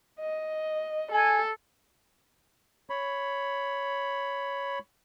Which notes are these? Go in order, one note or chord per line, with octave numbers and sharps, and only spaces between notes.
D#5
A4 G#5
C#5 B5